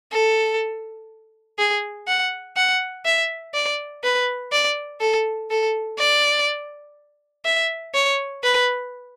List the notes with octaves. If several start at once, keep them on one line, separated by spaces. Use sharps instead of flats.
A4
G#4
F#5
F#5
E5
D5
B4
D5
A4
A4
D5
E5
C#5
B4